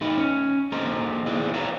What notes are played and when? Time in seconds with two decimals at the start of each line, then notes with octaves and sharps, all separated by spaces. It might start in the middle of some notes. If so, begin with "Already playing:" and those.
0.01 A3 D#4 B4
0.18 C#4
0.72 D3 A#3 A4 C5 D#5 A#5
1.26 E4 G#4 B4 C5 D5
1.54 B4 C#5 D5 E5 F5 A#5